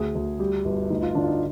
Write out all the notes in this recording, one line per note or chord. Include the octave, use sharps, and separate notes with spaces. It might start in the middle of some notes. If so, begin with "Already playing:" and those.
Already playing: D2 G#4
D2
G3 G4
G1
D2 D#4
F4
D3 D4
F4
D#4